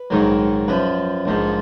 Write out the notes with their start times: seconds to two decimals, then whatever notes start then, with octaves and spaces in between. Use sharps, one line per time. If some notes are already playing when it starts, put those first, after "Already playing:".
Already playing: B4
0.10 A#1 G#2 D#3 F#3
0.68 F#2 F3 B4
1.25 A#1 G#2 F3